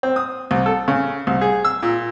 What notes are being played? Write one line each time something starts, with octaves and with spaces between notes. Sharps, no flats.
C4
D#6
C2
A4
C#3
C2
G#4
E6
A#2